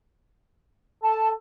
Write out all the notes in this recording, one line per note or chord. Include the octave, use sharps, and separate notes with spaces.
A4 A5